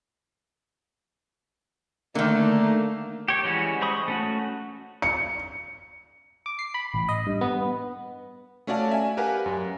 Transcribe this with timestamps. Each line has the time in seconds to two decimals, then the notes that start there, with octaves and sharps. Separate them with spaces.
2.15 D3 D#3 A3 A#3
3.28 G4 C#5
3.44 E3 G3 G#3 C#4 F#4
3.81 G#3 C5 B5 C#6 D#6
4.08 A3 C#4 F#4
5.02 C#7
6.46 D6
6.59 C7
6.74 B5
6.94 A1
7.09 D#5
7.27 G2
7.41 B3
8.67 A3 C#4 F#4 D5 F5 A5
8.91 E5 G#5
9.17 G4 A#4 B4 F5 F#5 G#5
9.46 F#2